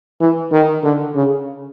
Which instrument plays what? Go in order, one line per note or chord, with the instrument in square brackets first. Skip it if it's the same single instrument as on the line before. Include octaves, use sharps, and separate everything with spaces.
[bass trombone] E3
D#3
D3
C#3